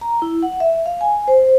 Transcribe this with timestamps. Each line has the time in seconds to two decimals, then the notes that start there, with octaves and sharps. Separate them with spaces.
0.01 A#5
0.22 E4
0.43 F#5
0.60 E5
0.86 F5
1.01 G#5
1.28 C5